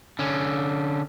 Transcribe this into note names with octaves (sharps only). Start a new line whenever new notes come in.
D3 C#4